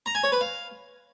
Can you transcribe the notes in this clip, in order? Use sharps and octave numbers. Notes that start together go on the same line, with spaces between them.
A#5
G#5
C#5
B4
F5